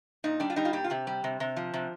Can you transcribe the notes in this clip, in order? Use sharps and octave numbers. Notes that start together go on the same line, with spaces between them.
A#2 D#4
G3 D4
F4
G3 D#4
F4
A#2 G4
F4
C3 G4
G3
C3
C3
F3
C3